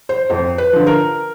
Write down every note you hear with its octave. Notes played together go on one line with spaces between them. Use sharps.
C5
F2 C5
B4
D3 F3
A#4